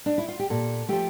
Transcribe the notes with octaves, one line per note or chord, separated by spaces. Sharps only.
D4
E4
F4
G4
A#2 A4
F3 A3 G4